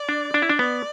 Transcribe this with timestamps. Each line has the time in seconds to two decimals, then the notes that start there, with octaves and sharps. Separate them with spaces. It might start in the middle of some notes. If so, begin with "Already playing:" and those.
Already playing: D5
0.09 D4
0.34 D4
0.42 E4
0.49 D4
0.59 B3 D5